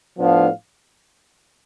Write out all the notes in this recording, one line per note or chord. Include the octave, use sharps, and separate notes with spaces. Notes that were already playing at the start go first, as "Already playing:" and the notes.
A2 F3 B3 D4 F5